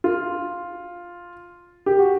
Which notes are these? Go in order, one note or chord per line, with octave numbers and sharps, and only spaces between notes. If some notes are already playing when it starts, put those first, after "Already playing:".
F4
G4
F#4